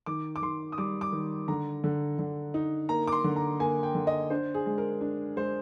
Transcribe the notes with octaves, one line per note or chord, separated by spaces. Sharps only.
D#3 D6
D6
D#3 C6
D#6
G3 D6
D6
D#3
D3 A#5
D3
D3
D#4
A#3 A#5
D6
C6
D3
A#5
A#3 G#5
G5
D3
D#5
D4 C5
G#4
G#3
A#4
D4
G#3 C5